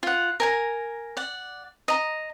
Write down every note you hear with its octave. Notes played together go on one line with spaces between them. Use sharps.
F4 F#5
A#4 G#5 A#5
D5 F#5
D#5 A#5